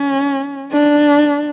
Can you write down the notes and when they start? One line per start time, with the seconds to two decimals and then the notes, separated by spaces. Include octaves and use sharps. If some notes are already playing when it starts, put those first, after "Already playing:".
Already playing: C#4
0.72 D4